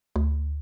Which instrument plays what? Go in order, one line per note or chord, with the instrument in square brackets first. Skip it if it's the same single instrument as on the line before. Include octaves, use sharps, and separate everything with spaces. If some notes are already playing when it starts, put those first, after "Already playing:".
[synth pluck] D2